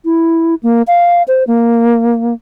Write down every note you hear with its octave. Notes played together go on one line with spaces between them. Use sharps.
E4
A#3
F5
C5
A#3